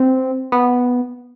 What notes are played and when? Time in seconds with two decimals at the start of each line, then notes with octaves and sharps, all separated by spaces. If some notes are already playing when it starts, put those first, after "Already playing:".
Already playing: C4
0.52 B3